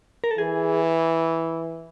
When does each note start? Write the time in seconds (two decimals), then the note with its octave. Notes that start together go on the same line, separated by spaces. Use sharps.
0.24 A#4
0.31 A4
0.38 E3 G#4